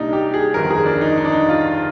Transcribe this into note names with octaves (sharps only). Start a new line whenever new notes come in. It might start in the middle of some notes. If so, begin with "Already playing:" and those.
Already playing: C2 A#2 G3 D4 D#4
G4
G#4
G1 F2 D#3 A#4
G#4
D4
D#4
D#4
D4
D#4
F4